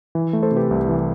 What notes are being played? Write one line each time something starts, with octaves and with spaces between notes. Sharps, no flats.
E3
A3
A4 C5
C3
G4 B4
C2
E3